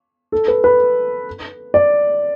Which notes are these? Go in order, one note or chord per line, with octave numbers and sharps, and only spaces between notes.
A4
B4
B4
D5